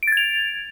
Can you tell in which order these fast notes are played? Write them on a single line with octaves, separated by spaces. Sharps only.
D7 A6 G#6 F7